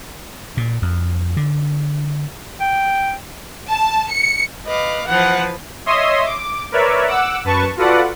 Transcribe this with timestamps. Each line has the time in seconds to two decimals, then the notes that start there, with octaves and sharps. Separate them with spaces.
0.57 A#2
0.82 F2
1.37 D3
2.60 G5
3.70 A5
4.12 C#7
4.66 B4 D#5 F5 D6
5.07 E3 F3 B4 F#5
5.86 C#5 D#5 E5 C6 D#6
6.25 D6
6.72 A#4 B4 C#5 D5 E5
7.07 F#5 D6 E6
7.44 F#2 B4 A5 C#6
7.77 F4 F#4 A4 B4 D5 F#5